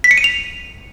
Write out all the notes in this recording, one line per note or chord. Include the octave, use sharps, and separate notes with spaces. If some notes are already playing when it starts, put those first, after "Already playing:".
B6
C#7
D#7
F7